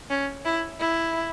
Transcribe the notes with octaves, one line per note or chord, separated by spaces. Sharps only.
C#4
E4
E4